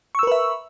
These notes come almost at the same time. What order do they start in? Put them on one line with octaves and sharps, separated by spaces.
C#6 E6 A#4 B4 E5